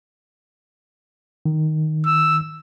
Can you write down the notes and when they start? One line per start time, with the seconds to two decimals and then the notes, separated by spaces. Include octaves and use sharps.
1.46 D#3
2.06 E6